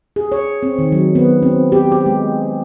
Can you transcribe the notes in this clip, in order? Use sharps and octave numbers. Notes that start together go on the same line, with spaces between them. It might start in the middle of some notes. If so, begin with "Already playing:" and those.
G#4
C#5
C4
D#3
F#3
B3
C4
G4
G4
G#3